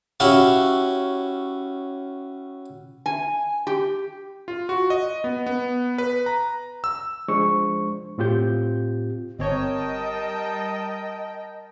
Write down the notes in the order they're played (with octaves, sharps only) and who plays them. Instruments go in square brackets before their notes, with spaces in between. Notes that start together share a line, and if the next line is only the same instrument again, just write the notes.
[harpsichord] C#4 E4 F#4 G4 F5 A5
[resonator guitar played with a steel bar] G#5
G4
[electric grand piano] F4
F#4
D#5
B3
B3
B4
A#5
E6
[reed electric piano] F3 G#3 D4 C5 C#6
A2 C4 F4 G4 G6
[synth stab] G1 C4 C#5 [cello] G3 [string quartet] A#4 G5 A5 [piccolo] D#5